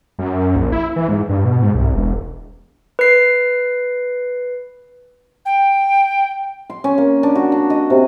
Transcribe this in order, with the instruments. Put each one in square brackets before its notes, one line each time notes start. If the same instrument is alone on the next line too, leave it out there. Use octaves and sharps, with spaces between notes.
[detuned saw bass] F#2
A#1
E4
E3
G#2
G2
B2
G#2
C2
E1
[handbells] B4 C7
[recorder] G5
[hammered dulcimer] C6
C#4
A#3
D4
F#4
D4
D#5
C3